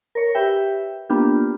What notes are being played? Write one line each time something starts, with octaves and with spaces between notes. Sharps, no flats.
A#4 C#5
G4 B4 E5 G5
A#3 B3 D4 F4 G4